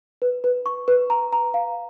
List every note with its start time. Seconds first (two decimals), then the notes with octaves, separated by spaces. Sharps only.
0.22 B4
0.44 B4
0.66 C#6
0.88 B4
1.10 A#5
1.33 A#5
1.54 F5